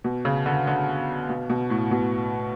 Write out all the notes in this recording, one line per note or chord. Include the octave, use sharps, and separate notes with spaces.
B2
C#3
D3
D3
B2
B2
A2
B2